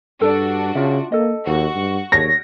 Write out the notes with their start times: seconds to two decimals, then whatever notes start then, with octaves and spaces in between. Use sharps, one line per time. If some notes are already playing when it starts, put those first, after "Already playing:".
0.21 G2 D4 F#4 A4 D5
0.75 C#3 F4 E5
1.12 A#3 A4 D#5
1.46 D#2 F#4 C#6
1.75 G2
2.12 D#2 C#5 A#6